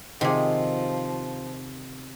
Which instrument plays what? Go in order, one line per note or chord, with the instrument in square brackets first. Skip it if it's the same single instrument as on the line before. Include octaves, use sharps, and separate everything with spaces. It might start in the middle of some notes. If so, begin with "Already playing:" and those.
[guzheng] C3 [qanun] D#3 G#4 [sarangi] F3